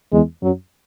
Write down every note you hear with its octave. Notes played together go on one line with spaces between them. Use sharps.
E2 G#3
F#2 F#3